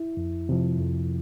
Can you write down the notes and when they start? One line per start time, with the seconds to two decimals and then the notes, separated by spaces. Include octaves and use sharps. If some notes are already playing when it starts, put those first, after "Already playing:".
Already playing: E4
0.17 F2
0.49 C3 F3
0.79 F2